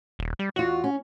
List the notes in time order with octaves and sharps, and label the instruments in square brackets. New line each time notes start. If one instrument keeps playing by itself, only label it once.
[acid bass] D#1
G3
[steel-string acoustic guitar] E2 F4 [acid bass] F#4
[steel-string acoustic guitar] C#4